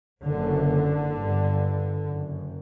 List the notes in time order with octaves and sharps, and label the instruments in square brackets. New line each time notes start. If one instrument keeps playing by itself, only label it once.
[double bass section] F#1 F#2 D3
G1 G2
F#1 F#2